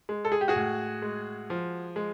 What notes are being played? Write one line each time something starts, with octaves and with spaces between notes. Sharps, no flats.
G#3
A4
G#4
G4
F#4 G#4
A2
G#3
F3
G#3